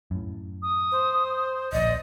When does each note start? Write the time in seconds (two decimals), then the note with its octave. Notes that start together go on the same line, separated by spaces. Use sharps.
0.11 F#2 A2
0.62 D#6
0.92 C5
1.73 D1 A#1 D5 D#5